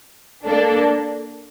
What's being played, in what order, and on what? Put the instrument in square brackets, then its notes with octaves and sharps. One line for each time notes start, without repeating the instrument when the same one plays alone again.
[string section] A#3 D4 A4